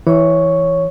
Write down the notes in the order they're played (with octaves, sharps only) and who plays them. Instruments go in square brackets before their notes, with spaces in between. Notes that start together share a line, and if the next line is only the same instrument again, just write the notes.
[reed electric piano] E3 [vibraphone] C#5 C#6